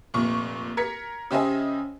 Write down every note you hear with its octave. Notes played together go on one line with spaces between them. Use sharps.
F1 A#2 C#6
A#4 G#6 B6 C#7
C#3 G4 C5 D#5 E5 G#5